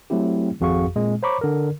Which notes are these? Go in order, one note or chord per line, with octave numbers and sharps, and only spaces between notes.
F#3 A3 C4 E4 G4
G#1 F2 F#4 G#4 F5 C#6
A#2 G#3 C4
C5 C#5 A#5 B5 C#6 D6
D3 A#4